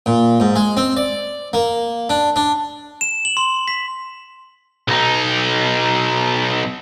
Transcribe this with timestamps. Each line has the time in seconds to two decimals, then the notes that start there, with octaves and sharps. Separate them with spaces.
0.06 A#2
0.40 G#2
0.56 G#3
0.77 C4
0.97 D5
1.53 A#3
2.10 D4
2.36 D4
3.01 E7
3.25 F#7
3.37 C6
3.68 B6
4.88 B1 D#4